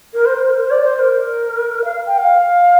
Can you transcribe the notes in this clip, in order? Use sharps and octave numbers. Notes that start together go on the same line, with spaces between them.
A#4
C5
A#4
C5
D5
C5
A#4
F5
G5
F5